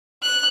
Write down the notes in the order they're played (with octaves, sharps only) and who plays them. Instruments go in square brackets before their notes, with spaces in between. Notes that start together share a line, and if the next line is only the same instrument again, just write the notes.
[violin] F#6